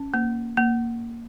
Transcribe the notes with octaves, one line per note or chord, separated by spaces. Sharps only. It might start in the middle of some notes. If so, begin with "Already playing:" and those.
Already playing: C#4
A#3
A#3